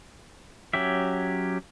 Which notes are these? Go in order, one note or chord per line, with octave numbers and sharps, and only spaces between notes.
F#3 C#4 G4 E5